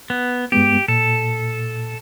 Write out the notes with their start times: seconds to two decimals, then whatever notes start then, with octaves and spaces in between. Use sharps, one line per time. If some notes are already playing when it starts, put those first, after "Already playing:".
0.10 B3
0.52 G2 G#3 B3 G4
0.88 A#2 A4